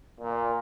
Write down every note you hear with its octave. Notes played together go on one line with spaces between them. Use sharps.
A#2